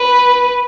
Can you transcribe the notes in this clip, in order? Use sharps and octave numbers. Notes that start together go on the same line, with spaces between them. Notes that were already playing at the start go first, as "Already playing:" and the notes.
Already playing: B4